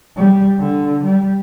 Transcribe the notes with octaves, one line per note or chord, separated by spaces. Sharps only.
G3
D3
G3